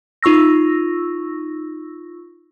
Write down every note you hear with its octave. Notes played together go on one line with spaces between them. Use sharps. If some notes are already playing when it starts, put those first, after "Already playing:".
D#4 F4 C#6 E6 A#6